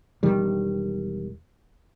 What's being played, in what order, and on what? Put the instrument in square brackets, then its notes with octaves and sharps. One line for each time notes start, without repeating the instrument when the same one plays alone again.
[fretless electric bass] E1 D#3 G3